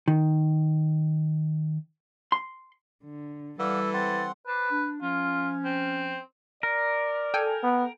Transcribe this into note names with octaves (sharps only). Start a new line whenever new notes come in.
D#3
C6
D3
E3 G3 A4 D5 F5 F#5 E6
C4 F#5 C6 A6
B4 C5 A5 D6
D4
F3 C#4 F4
C4
A#4 D5
A4 G5 G#5
B3